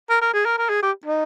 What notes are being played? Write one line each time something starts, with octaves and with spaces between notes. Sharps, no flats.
A#4
A#4
G#4
A#4
A#4
G#4
G4
D#4